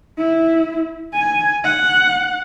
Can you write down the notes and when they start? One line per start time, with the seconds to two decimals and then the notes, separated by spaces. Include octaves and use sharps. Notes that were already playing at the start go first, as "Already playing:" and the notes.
0.18 E4
1.13 G#5
1.64 F#5